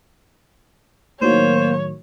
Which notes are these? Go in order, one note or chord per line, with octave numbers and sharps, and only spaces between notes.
A2 D#3 F#3 A#3 C5 C#5